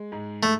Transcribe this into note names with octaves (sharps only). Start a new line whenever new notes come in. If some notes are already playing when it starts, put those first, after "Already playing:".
Already playing: G#3
G#2
A3